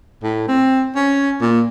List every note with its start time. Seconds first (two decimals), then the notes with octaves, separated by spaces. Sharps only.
0.23 A2
0.48 C4
0.96 C#4
1.41 A#2